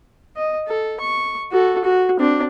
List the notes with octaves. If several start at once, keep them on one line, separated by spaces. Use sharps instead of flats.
D#5
A4
C#6
F#4 A4
F#4
C4 D4